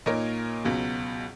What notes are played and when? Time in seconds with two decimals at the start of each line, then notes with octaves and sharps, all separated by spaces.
0.06 A#2 A#3 D#4 A#4 C#5
0.65 C#2 B2 F#3